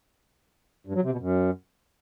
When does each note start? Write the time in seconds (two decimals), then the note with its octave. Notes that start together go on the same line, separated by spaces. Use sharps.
0.87 G2
0.95 F#3
1.03 C3
1.12 B2
1.20 F#2